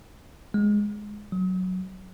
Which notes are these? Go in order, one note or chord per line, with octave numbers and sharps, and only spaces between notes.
G#3
F#3